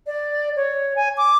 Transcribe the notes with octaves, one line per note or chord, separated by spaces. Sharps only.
D5
C#5
G#5
D6